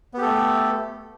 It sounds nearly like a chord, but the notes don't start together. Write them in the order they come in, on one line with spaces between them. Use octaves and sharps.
B3 G4 A4 A3